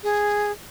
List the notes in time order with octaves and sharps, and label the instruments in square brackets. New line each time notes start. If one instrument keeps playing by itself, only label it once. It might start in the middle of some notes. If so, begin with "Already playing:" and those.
[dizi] G#4